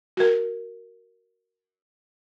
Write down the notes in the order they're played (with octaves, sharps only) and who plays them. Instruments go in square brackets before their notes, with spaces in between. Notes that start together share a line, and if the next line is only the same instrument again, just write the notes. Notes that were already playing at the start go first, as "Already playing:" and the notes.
[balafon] F#4 A#4